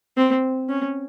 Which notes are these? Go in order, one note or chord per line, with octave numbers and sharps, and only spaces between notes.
C4
C#4